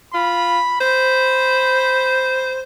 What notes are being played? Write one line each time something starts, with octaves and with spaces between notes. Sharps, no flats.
F4 B5
C5 B5